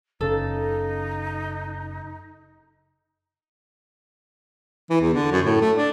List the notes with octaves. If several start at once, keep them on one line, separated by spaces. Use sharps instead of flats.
F#1 C#3 D#4 A4
E3
E2
D3
F#2
A2
A3
D4